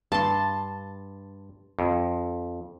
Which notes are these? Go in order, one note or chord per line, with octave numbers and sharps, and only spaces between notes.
G2 A5 C6
F2